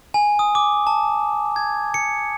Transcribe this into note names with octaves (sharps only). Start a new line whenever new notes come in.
G#5
D#6
D6
A5
G#6
C#7